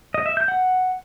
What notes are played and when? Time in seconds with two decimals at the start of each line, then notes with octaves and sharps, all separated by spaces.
0.14 D#5
0.26 E5
0.37 G6
0.48 F#5